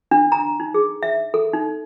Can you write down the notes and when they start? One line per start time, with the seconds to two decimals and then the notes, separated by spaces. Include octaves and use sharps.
0.11 D4
0.32 A#5
0.60 D#4
0.74 G#4
1.03 E5
1.34 A4
1.53 D#4